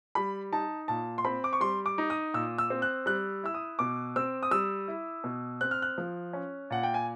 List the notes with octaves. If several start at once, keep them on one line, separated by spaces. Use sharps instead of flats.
G3 B5
D#4 A5
A#2 A5
C6
C4 B5
D6
C#6
G3 C6
D6
D#4
D#6
A#2 E6
E6
C4
F#6
G3 F#6
E4 E6
D#6
B2 D6
C4 E6
D#6
G3 E6
E4
B2
C4 F#6
F6
F#6
F3
C#4
A#2 F#5
G5
G#5